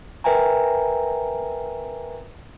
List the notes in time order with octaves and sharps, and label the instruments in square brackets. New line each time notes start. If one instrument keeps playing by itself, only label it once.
[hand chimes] A#4 B4 E5 G5 G#5 A#5